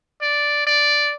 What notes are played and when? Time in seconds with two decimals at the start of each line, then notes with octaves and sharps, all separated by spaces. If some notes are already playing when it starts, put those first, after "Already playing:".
0.22 D5
0.67 D5